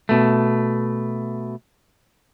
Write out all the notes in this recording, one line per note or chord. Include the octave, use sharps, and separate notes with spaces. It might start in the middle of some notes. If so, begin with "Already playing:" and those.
B2 A3